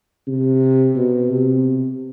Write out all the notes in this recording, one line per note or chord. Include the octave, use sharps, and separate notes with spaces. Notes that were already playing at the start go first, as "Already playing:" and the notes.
C3
B2
C3